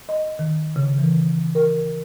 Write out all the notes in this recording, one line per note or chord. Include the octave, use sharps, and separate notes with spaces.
D#5
D#3
C#3
E3
A#4